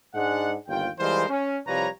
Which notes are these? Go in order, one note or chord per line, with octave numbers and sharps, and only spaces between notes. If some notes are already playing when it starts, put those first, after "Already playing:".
G#2 G#3 D4 F#5
G1 D#2 F4 G5
E3 G3 G#3 F4 A#4 C5
C#4
C2 F3 G3 B4 C#5 A#5